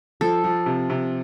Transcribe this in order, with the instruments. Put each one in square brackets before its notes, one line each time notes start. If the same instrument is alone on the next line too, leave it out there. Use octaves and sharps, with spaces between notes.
[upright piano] F3 [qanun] A4
[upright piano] F3
C3
C3